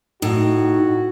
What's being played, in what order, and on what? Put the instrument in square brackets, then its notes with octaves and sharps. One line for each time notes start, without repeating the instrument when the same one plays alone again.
[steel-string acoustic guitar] A2 [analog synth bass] D#4 [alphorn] F#4